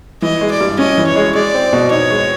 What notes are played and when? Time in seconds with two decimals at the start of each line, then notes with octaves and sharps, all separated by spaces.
0.22 E3 D#5
0.41 G#3
0.51 D5
0.61 G2
0.79 C#4 D#5
0.98 E3
1.07 C#5
1.16 G#3
1.35 G#3 D5
1.54 C4
1.73 B2
1.91 D#4 C#5
2.11 G#3